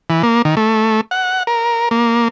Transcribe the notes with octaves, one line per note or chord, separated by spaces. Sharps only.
E3
A#3
D#3
A3
F#5
A#4
A#3